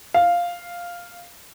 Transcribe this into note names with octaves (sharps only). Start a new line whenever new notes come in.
F5